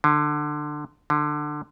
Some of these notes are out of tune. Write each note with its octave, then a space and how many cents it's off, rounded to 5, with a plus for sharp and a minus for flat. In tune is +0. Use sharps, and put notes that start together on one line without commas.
D3 +20
D3 +20